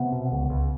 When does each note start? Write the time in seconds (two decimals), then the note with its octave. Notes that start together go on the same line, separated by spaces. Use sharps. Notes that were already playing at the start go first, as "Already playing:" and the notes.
Already playing: C3 B3
0.12 B2
0.32 C#2
0.50 C#2